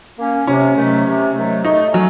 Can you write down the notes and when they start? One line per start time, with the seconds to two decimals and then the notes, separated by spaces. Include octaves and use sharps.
0.18 A#3 C#4
0.47 C3 C#4
0.76 D#3 F#3 A3
1.06 C3
1.35 D#3 F#3 A3
1.64 A3 D#4
1.93 F#3 C#4